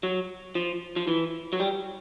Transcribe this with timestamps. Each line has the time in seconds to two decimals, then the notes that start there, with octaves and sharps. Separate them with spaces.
0.03 F#3
0.55 F3
0.96 F3
1.07 E3
1.53 F#3
1.60 G3